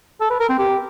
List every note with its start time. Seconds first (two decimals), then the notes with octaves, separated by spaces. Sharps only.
0.21 A4
0.30 B4
0.40 A#4
0.49 C4
0.59 G4